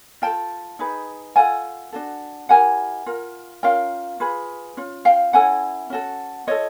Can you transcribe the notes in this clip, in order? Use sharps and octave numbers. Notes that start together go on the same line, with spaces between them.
F4 A4 G5 A5
D#4 G#4 B4
F4 A4 F#5 G#5
D4 F#4 A4
E4 G4 A#4 F#5 G#5
F4 A#4
C#4 F4 A#4 F5 G5
F4 G#4 B4
C#4 F4
F5 G5
C#4 E4 A4 F#5 G#5
C#4 F#4 A4
F4 A4 C#5 D#5